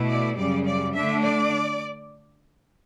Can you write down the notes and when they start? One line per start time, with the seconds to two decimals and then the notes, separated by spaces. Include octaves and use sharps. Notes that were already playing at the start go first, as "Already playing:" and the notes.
Already playing: B2 A3 E4
0.09 D5
0.38 F#2 C#3 G3 D5
0.66 D5
0.95 D3 A3 D4 E5
1.23 D5